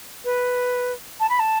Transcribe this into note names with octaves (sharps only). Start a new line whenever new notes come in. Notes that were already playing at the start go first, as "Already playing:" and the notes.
B4
A5
B5
A5